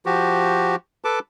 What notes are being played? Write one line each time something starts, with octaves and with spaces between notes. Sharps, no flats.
F3 F#4 G4
A4 B4 A5 D6